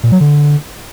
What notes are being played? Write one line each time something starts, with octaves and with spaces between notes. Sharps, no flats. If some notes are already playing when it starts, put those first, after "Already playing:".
A#2
F#3
D3